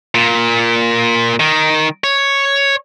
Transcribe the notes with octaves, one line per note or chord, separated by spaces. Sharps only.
A#2
D#3
C#5